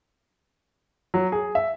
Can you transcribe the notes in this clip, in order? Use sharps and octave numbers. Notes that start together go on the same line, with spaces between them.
F#3
G#4
E5